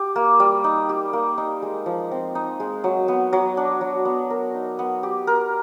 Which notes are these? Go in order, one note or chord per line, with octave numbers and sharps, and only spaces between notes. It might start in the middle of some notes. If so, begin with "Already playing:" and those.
Already playing: G4
A#3
G3
D#4
G4
A#3
D#4
G#3
F3
C4
D#4
G#3
F#3
B3
F#3
D4
F#3
B3
A#4
D#4
B3
G4
A#4